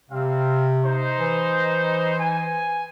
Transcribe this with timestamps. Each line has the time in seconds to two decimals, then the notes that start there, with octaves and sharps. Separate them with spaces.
0.10 C3 G3 C4 F5
0.85 D#4 C5
1.18 E3
2.19 G#5